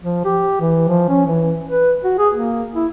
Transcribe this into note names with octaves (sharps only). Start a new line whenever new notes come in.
F3
G4
E3
F3
C#4
E3
B4
F#4
G#4
A#3
E4